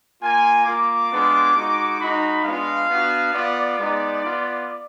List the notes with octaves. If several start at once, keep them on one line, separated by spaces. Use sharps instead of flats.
A#3 F4 G#5
A#3 F4 D6
G#3 B3 D4 F4
G#3 D#4 F#4
G#3 D#4 F#4 B5
G#3 B3 D4 F4 F5
B3 D4 F#4
B3 F4 D5
G#3 B3 D#4
B3 F4